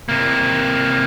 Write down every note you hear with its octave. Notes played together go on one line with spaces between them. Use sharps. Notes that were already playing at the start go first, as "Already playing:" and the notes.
C3 A#3